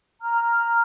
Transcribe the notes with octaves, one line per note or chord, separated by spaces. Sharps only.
A#5 F6